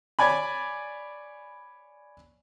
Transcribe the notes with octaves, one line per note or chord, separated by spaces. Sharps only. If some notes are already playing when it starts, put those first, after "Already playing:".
C#5 D5 G#5 B5